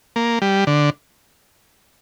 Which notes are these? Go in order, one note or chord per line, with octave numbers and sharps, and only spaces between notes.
A#3
G3
D3